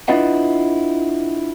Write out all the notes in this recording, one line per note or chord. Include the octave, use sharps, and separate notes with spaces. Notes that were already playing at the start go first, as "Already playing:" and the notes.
D4 E4 F4 B4 D#5 F#5